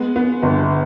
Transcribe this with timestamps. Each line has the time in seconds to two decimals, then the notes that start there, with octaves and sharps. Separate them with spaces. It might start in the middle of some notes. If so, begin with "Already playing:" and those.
Already playing: G#3 B3
0.16 B3
0.43 G1